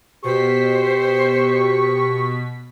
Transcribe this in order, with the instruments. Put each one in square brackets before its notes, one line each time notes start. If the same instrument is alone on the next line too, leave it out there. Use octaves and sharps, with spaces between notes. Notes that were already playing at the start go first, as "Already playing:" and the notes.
[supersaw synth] B2 B6 [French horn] G4 [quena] C5 [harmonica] C#6